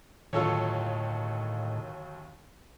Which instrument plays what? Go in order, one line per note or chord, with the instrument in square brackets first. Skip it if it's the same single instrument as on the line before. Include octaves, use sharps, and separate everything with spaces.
[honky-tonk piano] G1 D#2 F#3 [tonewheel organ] A2 D#3 [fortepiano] F4 A4 C#5